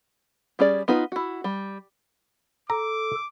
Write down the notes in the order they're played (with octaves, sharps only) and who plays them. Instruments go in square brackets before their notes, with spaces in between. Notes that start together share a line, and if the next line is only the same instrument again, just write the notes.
[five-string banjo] G3 C#4 G#4 D5
B3 D#4 F4 B4
E4 F#4
G3
[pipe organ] A4 [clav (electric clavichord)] A#5 [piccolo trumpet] D6